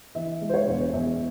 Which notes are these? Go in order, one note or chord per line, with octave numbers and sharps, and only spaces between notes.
E3 E5
G#3
C5
C#5
E1
E2 E5